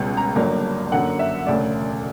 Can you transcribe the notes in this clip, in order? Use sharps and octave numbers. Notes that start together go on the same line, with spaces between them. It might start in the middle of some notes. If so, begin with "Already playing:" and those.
Already playing: C#2 B2 G3
A#5
G1 G2 F#3 A#3
F#2 D3 A#3 F#5
E5
E1 D2 C#3 D5